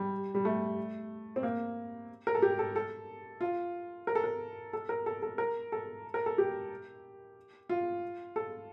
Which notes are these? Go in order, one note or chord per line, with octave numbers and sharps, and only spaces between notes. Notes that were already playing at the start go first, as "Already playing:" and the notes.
Already playing: G3
G3
A3
C4
A#3
A#4
A4
G4
A4
A4
F4
A#4
A4
A#4
A4
A#4
A4
A4
A#4
A4
A#4
A4
G4
F4
A4